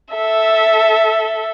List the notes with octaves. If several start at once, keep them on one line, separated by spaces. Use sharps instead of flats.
A4 E5